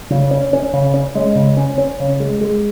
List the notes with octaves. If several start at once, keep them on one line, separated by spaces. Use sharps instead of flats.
C#3
C#4
C#4
C#3
C#4
G#3
C#3
C#4
C#4
C#3
G#3
G#3